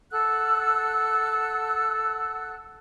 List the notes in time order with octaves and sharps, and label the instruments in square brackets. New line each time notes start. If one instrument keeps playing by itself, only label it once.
[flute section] A4 F#5 E6 F#6